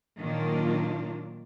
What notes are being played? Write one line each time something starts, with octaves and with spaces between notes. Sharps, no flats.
A#2 D#3 F#3 A#3 D4 F4